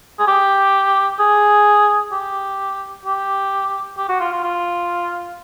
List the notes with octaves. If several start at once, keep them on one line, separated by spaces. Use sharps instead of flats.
G#4
G4
G#4
G4
G4
G4
F#4
F4
F4
F4